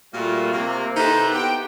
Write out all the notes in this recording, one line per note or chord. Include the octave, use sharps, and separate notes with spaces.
A#2 G3 A3 A#3 F4 F#4
C3 A#3
D#4 E4 G4 A4 B4 C5
B3 G4 G5